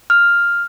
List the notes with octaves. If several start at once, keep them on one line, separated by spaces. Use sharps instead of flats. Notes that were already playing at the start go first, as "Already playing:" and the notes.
F6